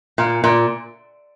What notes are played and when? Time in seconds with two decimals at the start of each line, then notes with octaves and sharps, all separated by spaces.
0.18 A#2
0.44 A#2